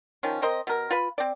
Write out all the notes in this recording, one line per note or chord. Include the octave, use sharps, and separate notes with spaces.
D#3 F3 C#4
C4 A#4 C5 D#5
B2 A#4
F4 B4 B5
C4 D5